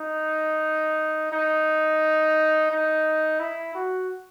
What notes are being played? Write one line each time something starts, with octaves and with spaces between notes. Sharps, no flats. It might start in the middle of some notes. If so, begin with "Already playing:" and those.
Already playing: D#4
D#4
D#4
E4
F#4